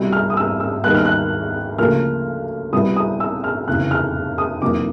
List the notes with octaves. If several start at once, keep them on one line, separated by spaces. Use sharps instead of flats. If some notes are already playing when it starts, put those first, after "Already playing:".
Already playing: C2 B2 G3
F6
D#6
E6
E6
D#2 D#3 G3 B3 F#6
F6
F#6
D2 C#3 F3 A#3 F6
C2 B2 G3 B3 E4 D#6
D#6
E6
F6
F1 E2 C#3 F#6
F6
D#6
F1 E2 B2 F#3 A#3 D6